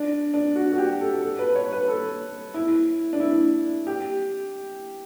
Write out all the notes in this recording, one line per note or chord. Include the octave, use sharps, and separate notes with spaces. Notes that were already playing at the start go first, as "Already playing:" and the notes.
Already playing: D4
D4
F#4
F#4
G4
A4
A4
B4
C#5
B4
A4
E4
D4
E4
G4